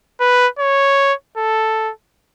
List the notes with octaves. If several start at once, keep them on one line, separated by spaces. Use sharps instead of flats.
B4
C#5
A4